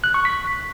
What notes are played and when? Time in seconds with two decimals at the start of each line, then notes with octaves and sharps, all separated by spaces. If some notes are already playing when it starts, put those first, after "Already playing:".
0.04 F#6
0.14 C#6
0.25 B6